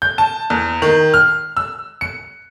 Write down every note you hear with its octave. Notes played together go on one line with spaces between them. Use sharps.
G6
A5
E2
D#3
F6
E6
C#7